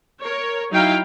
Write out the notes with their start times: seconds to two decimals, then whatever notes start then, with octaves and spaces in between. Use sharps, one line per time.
0.22 A#4 C#5
0.71 F#3 D#4 E4 F5 G5